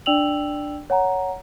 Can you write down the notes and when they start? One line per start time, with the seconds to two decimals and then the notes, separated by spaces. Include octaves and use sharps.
0.06 D4 D5 G5 E6 F7 F#7
0.90 C#5 F#5 G#5 A#5